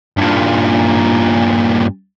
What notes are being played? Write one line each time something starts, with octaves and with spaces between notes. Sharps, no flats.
G2 A#2